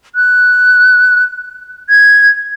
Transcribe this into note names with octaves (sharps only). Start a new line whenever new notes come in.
F#6
G#6